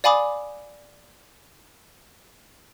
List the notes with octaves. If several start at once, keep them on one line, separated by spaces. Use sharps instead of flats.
D5 F5 G#5 B5 D6 D#6